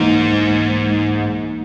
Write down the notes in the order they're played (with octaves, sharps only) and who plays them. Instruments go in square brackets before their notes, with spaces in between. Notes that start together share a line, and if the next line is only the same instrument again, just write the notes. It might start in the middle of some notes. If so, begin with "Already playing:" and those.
Already playing: [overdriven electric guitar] G#2 [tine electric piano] E3 A#3 D#4